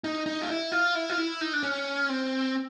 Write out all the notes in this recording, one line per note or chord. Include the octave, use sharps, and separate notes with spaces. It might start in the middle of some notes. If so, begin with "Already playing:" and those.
D#4
D#4
F4
E4
F4
E4
F4
E4
D#4
D4
C#4
C4